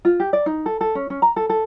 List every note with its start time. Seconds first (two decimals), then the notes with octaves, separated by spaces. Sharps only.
0.05 F4
0.20 G4
0.33 D5
0.46 D#4
0.66 A4
0.81 A4
0.95 C#4
1.10 C#4
1.22 A#5
1.36 A4
1.50 A4